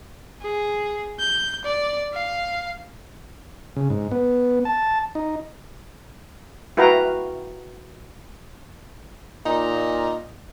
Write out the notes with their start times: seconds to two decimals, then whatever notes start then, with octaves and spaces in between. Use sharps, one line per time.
0.42 G#4
1.19 G6
1.65 D5
2.13 F5
3.77 C#3
3.90 G#2
4.11 B3
4.65 A5
5.15 D#4
6.77 E4 F#4 B4 F5 G5 A#5
9.46 A#2 D#4